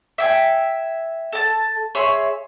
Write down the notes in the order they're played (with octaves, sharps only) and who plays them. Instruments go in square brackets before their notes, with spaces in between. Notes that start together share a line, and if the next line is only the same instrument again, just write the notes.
[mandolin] E5 G5 G#5
A4 A5
G#4 C#5 E5 C6